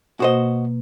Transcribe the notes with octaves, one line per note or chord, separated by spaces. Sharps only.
B2 A#3 F#4 C5 D#5